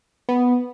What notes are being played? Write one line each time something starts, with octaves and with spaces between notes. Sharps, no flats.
B3